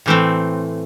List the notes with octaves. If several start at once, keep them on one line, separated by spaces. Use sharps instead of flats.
A2 E3 A3 C4